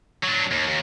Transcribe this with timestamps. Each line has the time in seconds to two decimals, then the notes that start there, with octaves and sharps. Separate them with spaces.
0.23 F#3 D4
0.51 D#2
0.67 D#2